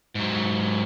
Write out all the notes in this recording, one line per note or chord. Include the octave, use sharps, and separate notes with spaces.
G#2 F#3